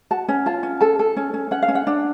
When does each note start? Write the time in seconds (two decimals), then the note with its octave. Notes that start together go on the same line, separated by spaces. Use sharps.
0.11 F#4 A5
0.28 C#4
0.46 F4 A5
0.63 C#4
0.81 A4 A5
0.99 A4
1.17 C#4
1.34 C#4
1.51 C#4 F#5
1.62 F5
1.68 C#4
1.75 F#5
1.87 D4